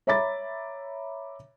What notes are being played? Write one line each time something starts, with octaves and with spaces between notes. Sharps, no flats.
C#5 E5 A#5 B5 D6 A6